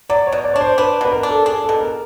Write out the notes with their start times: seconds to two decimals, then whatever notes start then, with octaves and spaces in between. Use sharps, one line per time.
0.09 F#3 D5
0.27 C#5
0.32 B2
0.44 D5
0.54 D4 C#5
0.61 C5
0.78 D4 B4
1.01 B2 B4
1.12 A#4
1.23 D4
1.29 A4
1.46 D4 G#4
1.63 A4
1.69 B2
1.81 A#4